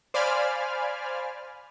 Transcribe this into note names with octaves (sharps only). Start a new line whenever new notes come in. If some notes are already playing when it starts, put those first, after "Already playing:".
C5 D5 F5 G#5 B5 F6